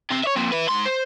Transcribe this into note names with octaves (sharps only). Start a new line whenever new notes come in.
C3 C4
C#5 E5
F2 A#2
E4 B4
G#2 C6
C5